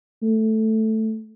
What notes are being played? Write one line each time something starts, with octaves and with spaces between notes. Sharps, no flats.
A3